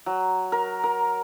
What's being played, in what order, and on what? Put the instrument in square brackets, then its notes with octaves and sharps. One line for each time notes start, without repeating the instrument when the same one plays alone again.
[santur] F#3
A#4
A#4